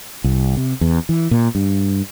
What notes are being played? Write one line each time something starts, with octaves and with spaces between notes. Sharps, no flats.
C2
C3
E2
E3
A#2
G2